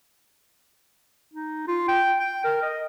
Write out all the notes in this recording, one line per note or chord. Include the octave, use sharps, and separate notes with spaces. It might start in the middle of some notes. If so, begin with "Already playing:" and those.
D#4
F4
G5
G5
A#4
D#5